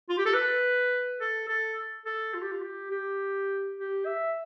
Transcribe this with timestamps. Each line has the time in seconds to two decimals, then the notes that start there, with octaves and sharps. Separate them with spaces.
0.10 F4
0.18 G4
0.26 A4
0.34 B4
1.20 A4
1.49 A4
2.06 A4
2.34 F4
2.42 G4
2.52 F4
2.62 G4
2.91 G4
3.77 G4
4.06 E5